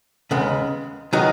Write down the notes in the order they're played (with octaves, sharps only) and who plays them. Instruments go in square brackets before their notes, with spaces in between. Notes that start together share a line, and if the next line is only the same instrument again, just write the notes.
[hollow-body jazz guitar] D#2 C#3 G#3 B3
D#3 F#3 B3 D#4 G#4